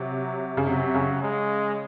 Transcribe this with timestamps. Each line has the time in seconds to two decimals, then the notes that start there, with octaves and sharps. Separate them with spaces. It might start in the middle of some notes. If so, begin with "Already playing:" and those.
Already playing: C3 F#3
0.57 C#3
0.67 C3 F#3
0.95 C#3
1.23 G#3